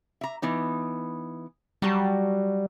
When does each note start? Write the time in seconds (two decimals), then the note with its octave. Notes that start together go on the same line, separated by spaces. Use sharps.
0.21 E5 A#5
0.42 E3 B3 D#4
1.82 F#3 G3 F#4 A5